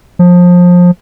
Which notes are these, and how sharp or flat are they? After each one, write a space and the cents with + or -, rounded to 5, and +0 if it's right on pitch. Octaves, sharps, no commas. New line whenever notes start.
F3 +25